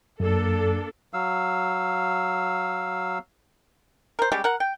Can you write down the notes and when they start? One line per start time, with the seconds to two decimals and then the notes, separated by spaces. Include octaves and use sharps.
0.20 F#2 A#3 D4 A4
1.13 F#3 F5 E6
4.19 A#4 C5
4.32 G3 G#3 C#4 G4
4.44 A#4 F#5
4.60 G5